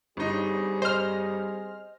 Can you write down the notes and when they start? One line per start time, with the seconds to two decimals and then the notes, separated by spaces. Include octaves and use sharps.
0.17 G1 G3 C4 D#4 G#4
0.82 C5 D#5 F6